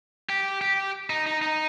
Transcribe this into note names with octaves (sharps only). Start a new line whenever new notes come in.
G4
G4
D#4
D#4
D#4